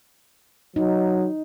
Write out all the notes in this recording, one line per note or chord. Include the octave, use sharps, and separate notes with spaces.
F#3 D#4